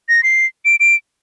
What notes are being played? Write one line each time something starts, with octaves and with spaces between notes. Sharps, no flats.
A#6
C7
D7
D7